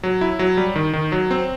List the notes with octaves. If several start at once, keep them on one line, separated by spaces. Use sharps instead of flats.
F#3
E4
F#3
G3
D#3
D#3
F#3
C4